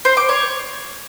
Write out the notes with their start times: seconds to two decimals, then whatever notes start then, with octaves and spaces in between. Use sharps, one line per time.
0.05 C5
0.17 D6
0.29 C#5